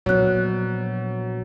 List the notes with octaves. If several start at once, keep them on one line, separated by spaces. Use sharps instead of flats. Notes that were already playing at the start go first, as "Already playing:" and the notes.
A#1 F#3 B3 C#5 F#6